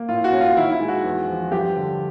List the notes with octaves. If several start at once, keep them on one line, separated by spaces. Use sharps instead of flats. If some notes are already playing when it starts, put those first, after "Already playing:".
Already playing: A#3
A2 F4
F#4
C#4
F4
D#3 E4
E4
G#3
F#4
E2
F3
G2 G4
D3